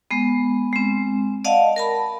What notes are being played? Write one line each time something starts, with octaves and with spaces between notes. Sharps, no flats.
G#3 B3
G#3 C4
D5 D#5 F5 F#5 A5
A#4 A5 B5